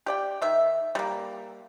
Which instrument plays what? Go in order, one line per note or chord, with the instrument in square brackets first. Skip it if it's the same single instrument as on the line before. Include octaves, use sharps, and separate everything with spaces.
[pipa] G4 D5 G5
D#3 E5
G3 A#3